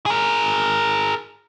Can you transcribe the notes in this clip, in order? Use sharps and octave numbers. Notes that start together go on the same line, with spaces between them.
G#4 A#4